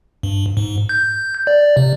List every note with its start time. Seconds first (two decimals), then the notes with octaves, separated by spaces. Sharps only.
0.23 G2
0.57 G#2
0.89 G6
1.47 D5
1.77 C3